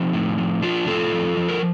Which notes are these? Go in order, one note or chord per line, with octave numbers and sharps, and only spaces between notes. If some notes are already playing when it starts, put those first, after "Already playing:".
Already playing: F3 C4 D#4
A2
F3
F3 D4 F4
A2 F4 A4
F3
F3
A#4